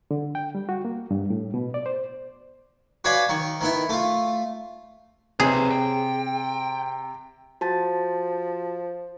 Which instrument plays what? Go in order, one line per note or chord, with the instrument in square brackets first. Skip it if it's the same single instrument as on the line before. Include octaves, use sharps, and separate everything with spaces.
[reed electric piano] D3
G5
G3
F#4
A#3
G2
A2
B2
D5
C5
[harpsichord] F#4 B4 C#5 D5 F5 G#5
D#3 C#6
D#3 B3 E4
A3 F4
[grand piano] C3 [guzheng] G#4 [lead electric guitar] B4 C#5
[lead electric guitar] G5
[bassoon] F3 [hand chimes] F#4 A5 A6